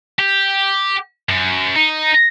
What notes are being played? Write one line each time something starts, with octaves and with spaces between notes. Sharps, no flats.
G4
F#2
D#4